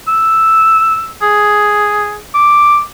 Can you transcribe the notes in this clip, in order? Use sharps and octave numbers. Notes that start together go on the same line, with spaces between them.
E6
G#4
D6